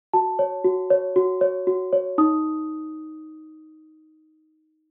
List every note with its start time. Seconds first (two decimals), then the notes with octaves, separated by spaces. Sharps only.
0.14 F#4 A5
0.39 C#5
0.64 F#4
0.90 C#5
1.16 F#4
1.41 C#5
1.67 F#4
1.93 C#5
2.18 D#4 D#6